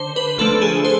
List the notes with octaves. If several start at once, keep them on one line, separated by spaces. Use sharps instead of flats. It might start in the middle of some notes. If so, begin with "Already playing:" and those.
Already playing: D3 C5
B4
F3 A3 D4 A4
G#4
C5